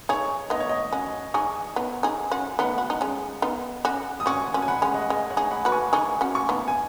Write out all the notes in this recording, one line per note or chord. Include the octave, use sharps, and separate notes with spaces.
D#4 G#4 C#5
B3 D#4 D#5
C#5
D#5
C#4 F#4
D#4 G#4 G#5 C#6
B3 D#4
D#4 G#4
C#4 F#4
B3 D#4 F#5 B5
F#4
D#4
G#3 C#4
B3 D#4
C#4 F#4
D#6
C#4 F#4 G#5 C#6
C#4 F#4
G#5
F#5 B5
G#3 C#4
D#5
F#5
G#3 D#5 G#5
C#5 F#5
D#4 G#4
F#5 B5
F#4 B4
G#5 C#6
D#4 G#4 G#5 C#6
C#4 F#4
G#5 C#6
B3 D#4
G#5